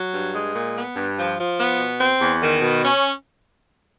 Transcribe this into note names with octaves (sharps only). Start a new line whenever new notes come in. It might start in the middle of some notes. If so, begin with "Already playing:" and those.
Already playing: F#3
G2
G#3
A#2
B3
G2
F3
F3
B3
B2
C4
E2
D#3
B2
C#4